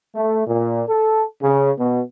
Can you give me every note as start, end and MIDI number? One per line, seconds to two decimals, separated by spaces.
0.15 0.42 57
0.47 0.83 46
0.88 1.23 69
1.42 1.72 49
1.79 2.01 47